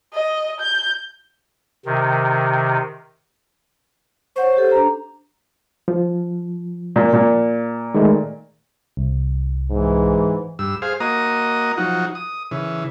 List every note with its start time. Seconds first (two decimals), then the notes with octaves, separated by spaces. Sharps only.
0.13 D#5
0.60 G6
1.86 C3 D#3
4.36 C5 C#5 F#5 C#6
4.57 G4 A4
4.72 D4 A#5
5.88 F3
6.96 A#2
7.13 A#2
7.95 D#3 G#3 A3
8.97 C2
9.70 G#2 E3
10.59 G2 E6
10.82 G#4 C5 F5
11.00 A#3 F#4 D#5 A#5 D#6
11.78 F3 F#3 D#4 F#4
12.15 D#6
12.51 C#3 E3